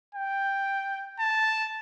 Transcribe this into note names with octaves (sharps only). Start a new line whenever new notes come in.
G5
A5